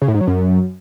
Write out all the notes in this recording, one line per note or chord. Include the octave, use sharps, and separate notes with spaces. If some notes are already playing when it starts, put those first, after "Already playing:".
C#3
A2
G#2
F#3
F#2